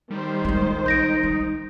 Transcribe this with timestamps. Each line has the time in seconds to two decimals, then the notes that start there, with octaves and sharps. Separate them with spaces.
0.10 D#3 G3 C5
0.45 A#1 G3 G#3
0.86 D#4 G6 A#6 D7
1.23 G3